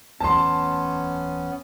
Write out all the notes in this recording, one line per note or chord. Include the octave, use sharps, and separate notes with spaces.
D1 E2 B3 C#4 A5 C6